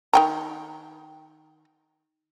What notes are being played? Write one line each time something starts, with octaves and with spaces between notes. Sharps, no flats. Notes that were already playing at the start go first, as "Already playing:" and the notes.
D#3 G5 A#5